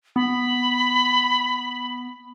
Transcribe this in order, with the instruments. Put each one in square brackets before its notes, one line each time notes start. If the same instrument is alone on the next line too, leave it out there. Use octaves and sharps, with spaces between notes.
[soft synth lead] B3 [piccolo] B5